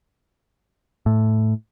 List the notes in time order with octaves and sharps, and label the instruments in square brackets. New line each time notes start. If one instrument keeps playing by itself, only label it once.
[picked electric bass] A2